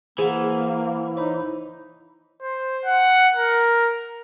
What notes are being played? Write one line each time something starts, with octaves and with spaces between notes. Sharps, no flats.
E3 A#3 G#4 C5 F#5
D#4 C5 C#5 B5
C5
F#5
A#4